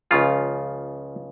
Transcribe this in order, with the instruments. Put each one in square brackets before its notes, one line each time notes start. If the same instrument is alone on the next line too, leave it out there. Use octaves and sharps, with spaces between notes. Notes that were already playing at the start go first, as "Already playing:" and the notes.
[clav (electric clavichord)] C#2 C#3 F3 F4